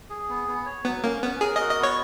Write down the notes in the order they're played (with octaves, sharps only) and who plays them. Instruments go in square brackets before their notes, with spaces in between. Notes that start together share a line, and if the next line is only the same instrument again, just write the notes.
[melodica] G#4
B3
B3
C#5
[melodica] F#3 [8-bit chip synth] B3
[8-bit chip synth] A#3 [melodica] C#4
[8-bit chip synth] B3 [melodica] C#4
[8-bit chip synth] G#4 [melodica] A#4
[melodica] F#4 [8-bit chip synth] D#5
[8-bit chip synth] D#5
[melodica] B3 [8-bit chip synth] C#5